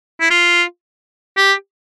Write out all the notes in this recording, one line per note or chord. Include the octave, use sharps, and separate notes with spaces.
E4
F4
G4